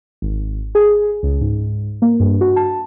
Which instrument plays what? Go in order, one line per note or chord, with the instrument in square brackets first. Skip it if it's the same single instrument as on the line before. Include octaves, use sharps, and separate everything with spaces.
[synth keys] G#1
G#4
C#2
G#2
A#3
G2
F#4
A5